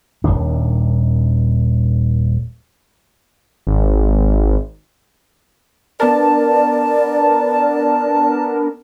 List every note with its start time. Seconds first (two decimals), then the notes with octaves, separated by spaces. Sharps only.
0.24 D#1 B1 D#3 D4
3.67 G#1
6.00 B3 D4 A#4 D5 A5